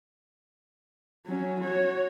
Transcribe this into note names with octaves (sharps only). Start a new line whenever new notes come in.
F#3 C#4
F#4 C#5